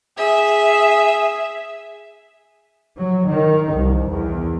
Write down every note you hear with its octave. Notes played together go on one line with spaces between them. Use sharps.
G#4 E5
F#3
D#3
C2
E2